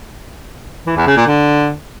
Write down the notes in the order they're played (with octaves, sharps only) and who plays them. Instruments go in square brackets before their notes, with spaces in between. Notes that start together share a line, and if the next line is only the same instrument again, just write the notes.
[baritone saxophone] E3
E2
C#3
A#2
D3